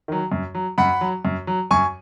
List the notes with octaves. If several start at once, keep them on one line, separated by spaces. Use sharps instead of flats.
D#3 F#3
F#2
F#3
F#2 F#5 B5
F#3
F#2
F#3
F#2 G#5 C#6